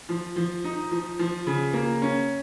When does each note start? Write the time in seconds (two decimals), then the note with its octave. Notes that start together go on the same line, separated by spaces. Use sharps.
0.09 F3
0.36 F3
0.64 D#4
0.91 F3
1.19 F3
1.47 C#3
1.73 A#3
2.02 C#4